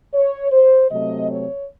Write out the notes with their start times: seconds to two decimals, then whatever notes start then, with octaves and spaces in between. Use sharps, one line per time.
0.14 C#5
0.52 C5
0.91 C3 F#3 A3 C4 D#5
1.31 C#5